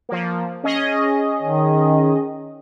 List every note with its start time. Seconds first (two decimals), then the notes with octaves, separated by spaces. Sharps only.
0.09 F3 A#3
0.64 C#4 G#4 D#5
1.42 D#3